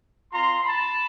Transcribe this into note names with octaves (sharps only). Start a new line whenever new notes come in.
C4 F4 A#5 C6
A5 B5